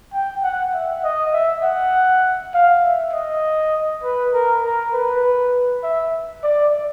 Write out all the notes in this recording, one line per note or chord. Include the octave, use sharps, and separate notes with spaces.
G5
F#5
E5
D#5
E5
F#5
F5
E5
D#5
B4
A#4
A#4
B4
E5
D5